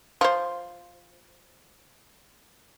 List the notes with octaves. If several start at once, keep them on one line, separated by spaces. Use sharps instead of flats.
F3 C5